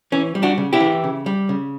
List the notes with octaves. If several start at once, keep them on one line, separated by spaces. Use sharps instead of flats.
E3 C#4
G3
D4 F#4
C#3
E4 G4
E3
C#3
G3
C#3